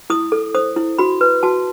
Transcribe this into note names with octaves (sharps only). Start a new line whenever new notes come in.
E4 D#6
A4
C5 D#6
E4
F#4 B5
B4
F#4 A5